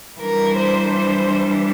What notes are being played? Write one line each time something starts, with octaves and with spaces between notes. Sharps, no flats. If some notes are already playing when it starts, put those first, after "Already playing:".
E3 G3 D4 A#4
C5
C5